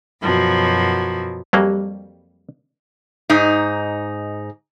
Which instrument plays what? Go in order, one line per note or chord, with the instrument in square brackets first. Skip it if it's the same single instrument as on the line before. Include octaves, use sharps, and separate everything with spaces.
[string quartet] F#2 B2 F3 F#3
[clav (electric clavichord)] F2 F#3 A#3 [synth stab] G3
[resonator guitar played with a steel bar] G#2 D#4